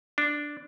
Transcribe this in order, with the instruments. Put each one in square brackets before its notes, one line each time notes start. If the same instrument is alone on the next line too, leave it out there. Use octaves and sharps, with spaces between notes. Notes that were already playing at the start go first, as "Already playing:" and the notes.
[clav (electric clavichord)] D4